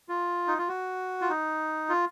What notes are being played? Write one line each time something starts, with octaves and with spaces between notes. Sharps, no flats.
F4
D#4
F4
F#4
F4
D#4
F4